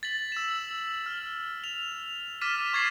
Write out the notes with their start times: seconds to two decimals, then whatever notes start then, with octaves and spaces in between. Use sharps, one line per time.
0.03 A6 B6 F#7
0.32 E6 E7
1.06 F6
1.64 F7
2.41 D6 F6 A6 B6 D#7 E7
2.73 C#6 G#6 A6 C7 E7 F#7